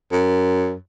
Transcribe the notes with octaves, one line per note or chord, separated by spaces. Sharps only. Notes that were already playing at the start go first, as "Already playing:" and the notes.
F#2